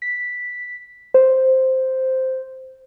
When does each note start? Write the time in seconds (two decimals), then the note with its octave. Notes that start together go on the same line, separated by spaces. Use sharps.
0.02 B6
1.14 C5